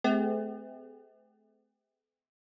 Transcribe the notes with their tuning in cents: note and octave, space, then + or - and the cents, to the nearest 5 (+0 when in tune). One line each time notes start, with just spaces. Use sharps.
A3 -35 C4 -45 G4 +45